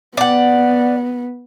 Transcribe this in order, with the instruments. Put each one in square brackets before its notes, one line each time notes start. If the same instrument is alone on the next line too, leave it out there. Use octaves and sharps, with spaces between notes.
[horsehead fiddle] B3 [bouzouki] D5 F#5